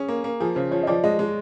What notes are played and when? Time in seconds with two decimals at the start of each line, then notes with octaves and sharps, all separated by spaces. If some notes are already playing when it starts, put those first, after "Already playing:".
Already playing: C#4 G#4
0.09 A#3
0.24 A#3
0.40 F3 G#4
0.56 C#3 C5
0.71 F3 C#5
0.83 D#5
0.87 F3 D5
1.04 G#3 D#5
1.19 G#3